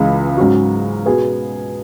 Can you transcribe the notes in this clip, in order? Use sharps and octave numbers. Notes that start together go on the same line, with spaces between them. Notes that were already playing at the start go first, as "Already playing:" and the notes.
Already playing: C#2 C#3 E3 G#3
G#2 F#3 C#4 F#4
B2 B3 G#4